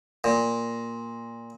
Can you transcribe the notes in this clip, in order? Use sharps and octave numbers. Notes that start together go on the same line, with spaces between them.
A#2